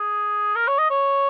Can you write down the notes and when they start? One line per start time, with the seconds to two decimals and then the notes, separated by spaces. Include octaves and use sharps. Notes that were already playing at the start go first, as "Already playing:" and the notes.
Already playing: G#4
0.56 A#4
0.67 C#5
0.78 D#5
0.90 C#5